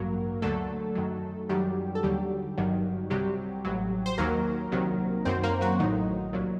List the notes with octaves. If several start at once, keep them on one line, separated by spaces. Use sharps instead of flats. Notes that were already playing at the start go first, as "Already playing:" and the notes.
Already playing: A1 G2 F#3 A#3 A#4
D2 D3 F#3 A3 A4
F#2 D#3 F#3
F#2 D#3 F#3 G3 G4
A4
D#2 D3 F#3 G3 G4
G1 G2 D#3 F#3
C2 C3 F#3 G3 G4
A1 A2 F#3
C5
D#2 D#3 F#3 A#3 A#4
C2 C3 D#3 F#3
F#2 D#3 F#3 C4 C5
A#3 A#4
F#3 F#4
A1 A2 D#3 F#3 D#4
C2 A#2 F#3